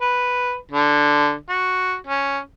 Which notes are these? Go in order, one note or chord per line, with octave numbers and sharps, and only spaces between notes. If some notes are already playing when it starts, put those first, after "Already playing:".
B4
D3
F#4
C#4